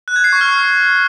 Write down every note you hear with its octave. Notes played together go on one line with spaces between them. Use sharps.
F#6
G#6
C7
C#6
F6